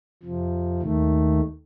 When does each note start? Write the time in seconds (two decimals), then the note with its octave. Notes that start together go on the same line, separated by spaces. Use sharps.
0.23 F2 C3 F3
0.82 D#2 D#3 A3